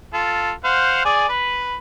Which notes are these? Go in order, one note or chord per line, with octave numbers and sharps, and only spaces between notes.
F4 A4
C5 F5 F#5
G#4 D5 G#5
B4 B5